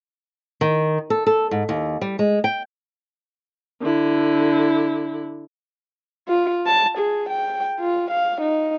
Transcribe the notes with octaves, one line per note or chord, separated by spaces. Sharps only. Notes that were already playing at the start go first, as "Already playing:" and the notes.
D#3
A4
A4
G#2
D#2
G3
G#3
G5
D3 E4
F4
A5
G#4
G5
F4
F5
D#4